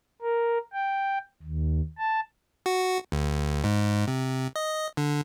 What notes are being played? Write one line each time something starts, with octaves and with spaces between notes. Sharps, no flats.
A#4
G5
D#2
A5
F#4
D2
G#2
C3
D#5
D3